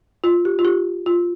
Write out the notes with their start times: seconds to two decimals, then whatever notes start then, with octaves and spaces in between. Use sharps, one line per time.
0.24 F4
0.45 G4
0.59 F4
0.65 G4
1.06 F4